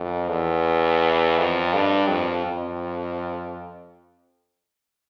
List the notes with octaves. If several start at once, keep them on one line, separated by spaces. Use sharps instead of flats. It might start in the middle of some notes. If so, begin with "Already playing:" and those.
Already playing: F2
E2
F2
G2
F2
F2